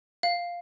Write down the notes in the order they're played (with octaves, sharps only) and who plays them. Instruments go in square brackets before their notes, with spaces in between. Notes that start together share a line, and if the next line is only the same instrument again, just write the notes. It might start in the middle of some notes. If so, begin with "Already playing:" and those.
[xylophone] F5